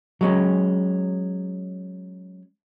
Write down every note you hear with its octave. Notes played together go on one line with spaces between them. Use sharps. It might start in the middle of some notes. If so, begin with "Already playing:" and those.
F#3 G#3 C#4